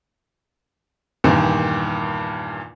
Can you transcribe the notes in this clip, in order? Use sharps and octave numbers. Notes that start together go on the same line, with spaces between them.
E2 G2 A#2 D#3